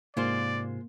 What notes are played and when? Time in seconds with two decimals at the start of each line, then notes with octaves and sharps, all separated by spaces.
0.17 G#2 C3 G#3 A#3 F4 C5 D5